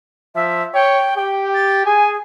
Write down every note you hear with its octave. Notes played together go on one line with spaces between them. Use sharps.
F3 E5
C#5 G5
G4 G5
A6
G#4 G#5